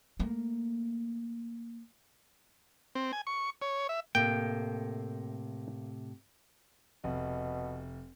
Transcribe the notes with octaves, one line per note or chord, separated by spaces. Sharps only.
A3 A#3
C4
G#5
C#6
C#5
E5
A2 C3 A#3 G5
F1 B2